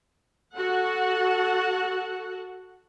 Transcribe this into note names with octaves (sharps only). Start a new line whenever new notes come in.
F#4 A4 F#5